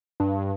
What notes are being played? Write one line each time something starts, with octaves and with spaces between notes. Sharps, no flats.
G2